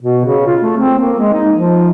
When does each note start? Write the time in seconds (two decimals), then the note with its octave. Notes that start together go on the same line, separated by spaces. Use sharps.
0.01 B2
0.26 C#3
0.47 F4
0.61 A3
0.77 C4
0.99 A#3
1.19 G#3
1.33 D#4
1.53 F3